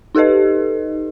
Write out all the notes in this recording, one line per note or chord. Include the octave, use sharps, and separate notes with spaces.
D#4 G4 A4 B4 D#5